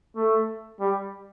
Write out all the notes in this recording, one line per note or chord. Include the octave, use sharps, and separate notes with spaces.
A3
G3